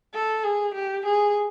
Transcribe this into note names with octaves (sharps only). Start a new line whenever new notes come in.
A4
G#4
G4
G#4